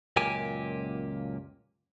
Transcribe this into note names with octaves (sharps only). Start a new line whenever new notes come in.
C#2 F#2 A#2 A#3 G4 G#5